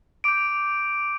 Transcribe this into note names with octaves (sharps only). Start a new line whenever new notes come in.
D6 G6 D7